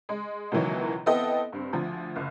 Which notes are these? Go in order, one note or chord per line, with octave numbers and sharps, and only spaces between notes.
G#3
C#2 B2 D#3 E3 F#3
B3 C4 E4 A4 D#5 G5
G2 C4
D2 F3
F#1